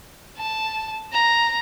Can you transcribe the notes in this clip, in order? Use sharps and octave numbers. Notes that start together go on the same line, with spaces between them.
A5
A#5